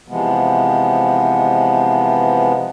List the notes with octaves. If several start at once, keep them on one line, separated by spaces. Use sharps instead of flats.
C3 E3 F3 G#3 B3